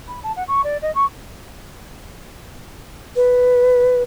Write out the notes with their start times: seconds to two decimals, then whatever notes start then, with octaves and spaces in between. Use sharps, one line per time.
0.08 B5
0.24 A5
0.36 F#5
0.48 C#6
0.64 D5
0.82 D#5
0.95 C#6
3.16 B4